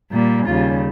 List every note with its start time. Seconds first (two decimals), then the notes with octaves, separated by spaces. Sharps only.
0.11 A#2 G3 A#3
0.46 D#2 C#3 G3 F4